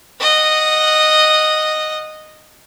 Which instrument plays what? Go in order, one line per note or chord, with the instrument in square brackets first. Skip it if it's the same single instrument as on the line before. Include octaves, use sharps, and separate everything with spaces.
[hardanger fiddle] D#5 F#5